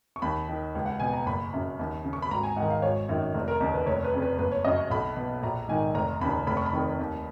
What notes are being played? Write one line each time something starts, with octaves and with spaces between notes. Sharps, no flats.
C#6
D#2 B5
D#3
C#2
F#5
B2 G#5
A#5
F#1 B5
F#2 C#3
D#2
C#3
C#6
B5
G#1 A#5
G#5
G#2 D#3 F#5
F5
G#1 C#5
F#2 D#3
F1
A#4
D#2 C#3 D#4
B4
F1 C#5
B4
F2 C#3
B4
F#1 B4
C#5
F#2 C#3 D#5
C#6
B1 B5
B2
A#1 A#5
G#2 D#3 G#5
F1 A#5
D#2 C#3 B5
F1 B5
C#6
B5
F2 D#3
D#2